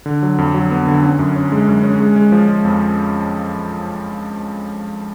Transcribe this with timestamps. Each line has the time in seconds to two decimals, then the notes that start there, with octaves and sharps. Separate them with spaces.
0.06 D3
0.22 F#3
0.38 F2
0.54 F#3
0.71 B3
0.87 D3
1.03 C#4
1.19 F#2
1.36 C#4
1.52 G#3
1.68 F#2
1.83 C#4
2.00 G#3
2.16 G#3
2.32 F3
2.48 G#3
2.65 F2